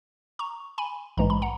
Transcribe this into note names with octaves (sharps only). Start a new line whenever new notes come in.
A#5 C#6
G#5 B5
A#1 G#2 E3 G#3 A#5
B5
F#5 A#5